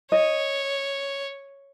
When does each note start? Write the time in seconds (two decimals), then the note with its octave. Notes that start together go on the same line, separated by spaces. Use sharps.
0.12 C#5 D#5